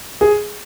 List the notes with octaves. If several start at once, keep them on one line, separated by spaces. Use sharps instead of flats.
G#4